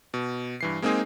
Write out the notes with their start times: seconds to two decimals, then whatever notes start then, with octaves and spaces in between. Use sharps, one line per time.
0.14 B2
0.61 G2 E3 C7
0.82 G#3 A#3 C4 D#4 G#4